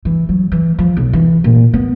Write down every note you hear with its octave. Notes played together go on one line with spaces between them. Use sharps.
E3
F#3
E3
F3
B1
E3
A#2
B3